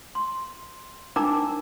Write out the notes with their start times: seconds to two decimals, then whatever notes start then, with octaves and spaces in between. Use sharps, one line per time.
0.15 C6
1.16 D4 D#4 A#4 G5 A#5 D6